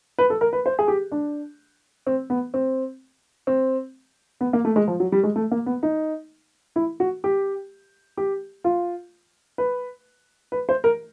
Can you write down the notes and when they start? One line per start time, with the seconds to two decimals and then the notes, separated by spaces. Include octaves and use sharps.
0.19 B4
0.30 A4
0.41 A#4
0.53 B4
0.66 C5
0.79 G#4
0.88 G4
1.12 D4
2.07 C4
2.30 B3
2.54 C4
3.47 C4
4.41 B3
4.53 A#3
4.65 A3
4.76 G#3
4.88 F3
5.00 F#3
5.12 G3
5.23 G#3
5.36 A3
5.51 A#3
5.66 B3
5.83 D#4
6.76 E4
7.00 F#4
7.24 G4
8.17 G4
8.64 F4
9.58 B4
10.52 B4
10.69 C5
10.84 A#4